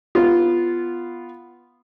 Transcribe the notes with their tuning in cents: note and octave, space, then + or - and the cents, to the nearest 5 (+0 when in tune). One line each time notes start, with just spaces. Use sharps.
B3 +0 F4 -10